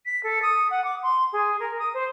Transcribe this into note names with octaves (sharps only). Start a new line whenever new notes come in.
B6
A4
D#6
F#5
D6
C6
G#4
A#4
D#6
C5